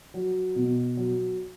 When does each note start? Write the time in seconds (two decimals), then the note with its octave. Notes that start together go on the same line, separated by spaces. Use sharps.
0.14 F#3
0.55 B2
0.97 F#3